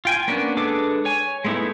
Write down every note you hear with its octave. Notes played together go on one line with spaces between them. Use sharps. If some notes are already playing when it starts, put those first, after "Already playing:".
F4 G5 G#5
A#3 B3 C#4 D4
G#3 D4 A4 B4 D6
C#5 G#5
G#3 A3 B3 D#4 E4